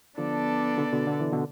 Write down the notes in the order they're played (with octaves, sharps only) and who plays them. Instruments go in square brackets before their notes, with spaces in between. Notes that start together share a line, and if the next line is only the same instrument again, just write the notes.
[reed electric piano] D3 F3 [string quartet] B3 D4 A4 D5
[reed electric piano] B2 D3
B2 D3
D3
E3
B2 D3